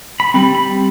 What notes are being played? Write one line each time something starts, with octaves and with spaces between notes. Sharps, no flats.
B5
G3 C4 B5
B5